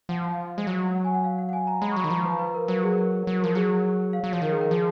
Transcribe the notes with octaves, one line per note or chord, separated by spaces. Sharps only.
F3 F#5
F5
G#3
F#3
F#5
G#5
F#5
F5
F#5
F#5
G#5
A#5
G#3 B5
C#6
F#3
B5
D#3
F3 A#5
B4
B4
A#4
F#3 A#4
G#4
A#4
F#3
A#4
F3
F#3 G#4
F5
F#3
F3 C#5
D#3 A#4
G#4
A#4
F3 G#4